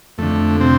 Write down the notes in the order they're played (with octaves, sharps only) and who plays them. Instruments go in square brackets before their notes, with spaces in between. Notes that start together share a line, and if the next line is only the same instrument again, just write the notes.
[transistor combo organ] F2 D3 A3
C3 C4